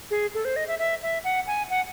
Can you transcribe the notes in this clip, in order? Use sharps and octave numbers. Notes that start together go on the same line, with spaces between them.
G#4
A4
C5
D#5
E5
E5
E5
F#5
G#5
F#5